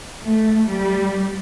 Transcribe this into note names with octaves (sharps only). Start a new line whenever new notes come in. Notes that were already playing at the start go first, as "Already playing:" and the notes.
A3
G3